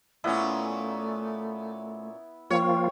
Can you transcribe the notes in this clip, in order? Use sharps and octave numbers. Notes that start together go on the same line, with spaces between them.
A#2 A3 B3 C#4 E4
F3 A#3 F4 C#5 G5